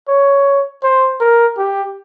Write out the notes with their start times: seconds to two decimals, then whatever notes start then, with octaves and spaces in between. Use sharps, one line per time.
0.08 C#5
0.83 C5
1.20 A#4
1.58 G4